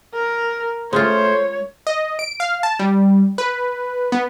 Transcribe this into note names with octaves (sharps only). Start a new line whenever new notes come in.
A#4
G#3 A3 C#4 F4 C5 C#5
D#5
D7
F5
A5
G3
B4
B3